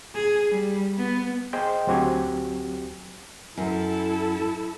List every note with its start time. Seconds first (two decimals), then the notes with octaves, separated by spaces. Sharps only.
0.15 G#4
0.51 G3
0.98 B3
1.53 G#4 C5 D#5 G5
1.87 D2 F#3 C4 F#4 G4 G#5
3.58 F#2 E4 A4